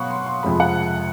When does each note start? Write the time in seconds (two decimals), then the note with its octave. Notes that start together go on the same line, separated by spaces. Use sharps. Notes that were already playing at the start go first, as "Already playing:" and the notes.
Already playing: B2 F#3 F5 F#5 B5 C#6
0.10 C6
0.26 C6
0.43 F2 C3 F3 G#3 B5
0.60 F#5